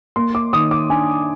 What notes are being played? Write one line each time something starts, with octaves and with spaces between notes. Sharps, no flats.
A#3 C6
D6
D#3 D#6
D6
D4 G#5